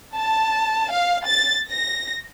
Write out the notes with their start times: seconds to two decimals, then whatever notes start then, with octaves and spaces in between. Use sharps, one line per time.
0.15 A5
0.90 F5
1.26 A6
1.71 A#6